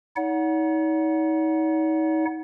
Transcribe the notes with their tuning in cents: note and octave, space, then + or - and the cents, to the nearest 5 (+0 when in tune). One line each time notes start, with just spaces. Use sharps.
D#4 +35 C#5 +45 F#5 -5